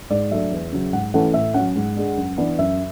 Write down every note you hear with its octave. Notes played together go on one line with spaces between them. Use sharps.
G#2 D5
F#3 A3 D4 E5
E2
C#3 F#3
G#2 F#5
E3 A3 C#4 F#5
A2 E5
F#3 C#4 F#5
G#2
G#3 D4
F#2
E3 B3 D4
F#2 E5